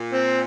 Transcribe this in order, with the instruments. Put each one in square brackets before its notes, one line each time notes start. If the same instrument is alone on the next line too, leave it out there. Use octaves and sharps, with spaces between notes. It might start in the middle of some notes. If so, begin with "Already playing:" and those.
Already playing: [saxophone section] A#2
[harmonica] C4